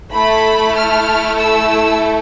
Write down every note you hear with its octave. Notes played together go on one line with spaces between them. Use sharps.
A3 E4 A4 B5
F6
E6